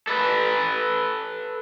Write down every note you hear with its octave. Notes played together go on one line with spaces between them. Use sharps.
A4 B4